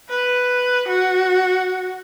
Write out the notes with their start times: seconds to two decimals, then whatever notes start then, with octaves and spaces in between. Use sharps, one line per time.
0.10 B4
0.88 F#4